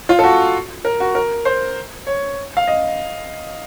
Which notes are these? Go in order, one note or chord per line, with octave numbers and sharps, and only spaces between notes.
F4
A4
F#4
A#4
F#4
A#4
C5
C#5
F5
D#5